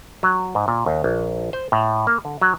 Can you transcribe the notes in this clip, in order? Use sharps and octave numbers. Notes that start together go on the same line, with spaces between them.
F#3
G#2
A#2
D#2
A#1
C5
A2
A#3
D3
F#3